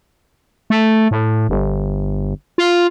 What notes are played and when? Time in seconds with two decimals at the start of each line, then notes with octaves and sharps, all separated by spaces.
0.70 A3
1.11 A2
1.49 G1
2.58 F4